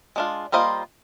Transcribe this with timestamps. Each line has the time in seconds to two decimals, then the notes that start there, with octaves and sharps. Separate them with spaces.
0.16 G#3 D4 F4
0.52 G3 A#3 F4 C5 D#5